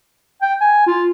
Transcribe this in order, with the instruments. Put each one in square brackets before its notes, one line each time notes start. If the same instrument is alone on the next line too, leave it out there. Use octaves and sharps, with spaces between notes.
[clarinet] G5
G#5
F4